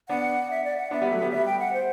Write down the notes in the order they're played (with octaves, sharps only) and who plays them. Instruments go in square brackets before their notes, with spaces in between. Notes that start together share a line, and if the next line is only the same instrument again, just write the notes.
[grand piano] B3 D4 [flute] F#5
[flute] E5
D5
F#5
[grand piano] B3 D4 [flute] E5
[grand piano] G3 B3
F#3 A3
G3 B3
[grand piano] G3 B3 [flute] E5
[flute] G5
F#5
C5